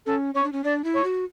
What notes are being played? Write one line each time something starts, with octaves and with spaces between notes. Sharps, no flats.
C#4 A4
C#4 C#5
D4
C#4
D4 D5
E4
C#5
F#4